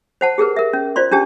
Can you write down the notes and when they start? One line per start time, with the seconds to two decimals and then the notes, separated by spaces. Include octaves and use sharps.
0.21 C5 F#5 A5
0.38 G4 G#4 A#4 B4
0.56 A#4 E5
0.73 C#4
0.96 F4 C5 D5 C6
1.12 C#4 D4 G4 A5